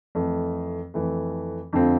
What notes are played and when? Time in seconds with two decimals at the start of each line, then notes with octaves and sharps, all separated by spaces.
0.15 F2 E3 A3
0.94 F2 E3 A3
1.73 F2 D3 A3 C4 F4